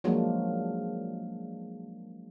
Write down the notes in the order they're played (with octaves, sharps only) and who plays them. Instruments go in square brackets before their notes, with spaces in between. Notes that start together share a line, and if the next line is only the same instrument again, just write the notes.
[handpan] F3 F#3 G#3 A#3 D4